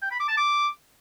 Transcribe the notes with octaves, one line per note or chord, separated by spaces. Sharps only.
G5
B5
D6
A5
D6